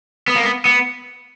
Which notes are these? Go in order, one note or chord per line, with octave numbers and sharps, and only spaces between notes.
B3
A#3
B3
B3